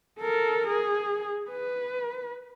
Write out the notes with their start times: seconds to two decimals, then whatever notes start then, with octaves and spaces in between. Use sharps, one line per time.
0.20 A4 A#4
0.67 G#4
1.50 B4